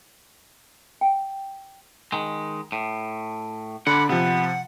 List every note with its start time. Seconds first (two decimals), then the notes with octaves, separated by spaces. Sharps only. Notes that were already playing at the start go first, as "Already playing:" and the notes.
1.01 G5
2.12 D#3 G#3
2.72 A2
3.87 D3 D5 F#5 B5
4.09 C3 F3 B3 F#5